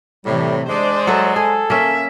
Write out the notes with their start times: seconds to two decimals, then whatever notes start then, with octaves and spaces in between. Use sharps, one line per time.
0.25 A2 C3 E3 G3
0.69 G#3 D4 C5 D5
1.07 F#3 A4 E5 F#5
1.36 G#4 A4
1.70 A#3 C#4 E5